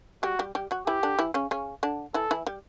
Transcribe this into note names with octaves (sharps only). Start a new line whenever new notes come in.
G3 F#4 G4
G3 G4
G3 G4
F#3 F#4
E3 E4 G4
D3 D4
E3 E4
C#3 C#4
C#3 C#4
D3 D4
E3 E4 A4
E3 E4
G3 G4